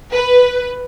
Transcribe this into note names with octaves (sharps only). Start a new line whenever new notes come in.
B4